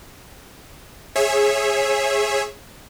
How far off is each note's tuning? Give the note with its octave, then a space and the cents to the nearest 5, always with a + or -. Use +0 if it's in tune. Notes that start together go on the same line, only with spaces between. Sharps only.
G#4 +0 C#5 -25 E5 +0